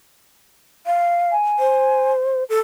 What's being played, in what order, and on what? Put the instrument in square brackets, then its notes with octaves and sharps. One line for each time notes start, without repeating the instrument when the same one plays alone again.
[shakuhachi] F5
[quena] G#5
[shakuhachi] C5
A4